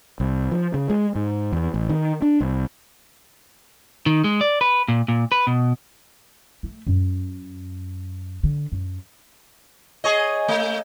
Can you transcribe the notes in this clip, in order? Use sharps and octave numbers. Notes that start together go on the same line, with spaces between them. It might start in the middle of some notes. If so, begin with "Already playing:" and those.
C2
F3
C#3
G#3
G#2
E2
A1
D#3
D4
C2
D#3
G#3
D5
B4
A#2
A#2
B4
B2
A3
F#2
D3
F#2
G#4 C#5 D#5
A3